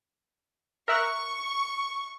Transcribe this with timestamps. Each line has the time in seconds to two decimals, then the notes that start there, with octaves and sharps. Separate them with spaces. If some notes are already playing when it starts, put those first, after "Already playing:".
0.88 A#4 E5 C#6 F#6